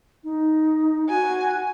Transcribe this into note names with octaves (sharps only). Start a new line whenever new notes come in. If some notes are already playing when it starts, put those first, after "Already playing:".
D#4
F#4 G#5